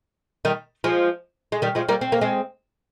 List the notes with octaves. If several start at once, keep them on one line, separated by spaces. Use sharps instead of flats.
D#3 G3
F3 G#3
G#3
D#3 G3
F3 G#3
G3 A#3
C4
A#3
G#3 C4